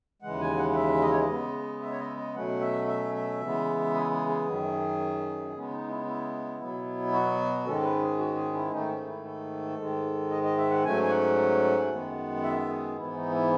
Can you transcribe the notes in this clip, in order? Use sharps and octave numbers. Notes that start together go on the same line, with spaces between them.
D#2 C#3 E3 G#3 F#5
G#5
F#5
F#5
E5
D#5
C#5
D#5
C#3 G#3 B3
E5
C#5
D#5
D#5
B2 F#3 A3 C#4 F#5
E5
E5
E5
C#3 E3 G#3 B3
G#4
G#4
G#4
F#2 D#3 F#3 C#4
C#3 G#3 B3 C#4
D#4
E4
E4
B2 F#3 B3
F#4
G#2 D#3 G#3 C#4 A4
B4
G#4
F#4
G#4
E4
G#2 D#3 A3 C#4 D#4
C#4
E4
A4
G#2 D#3 G#3
D#5
D#5
E5
F#5
G#2 F#3 A3 C#4 G#5
G#5
F#5
F#2 D#3 G#3 B3
E5
G#4
G#2 E3 B3 E4
D#4
E4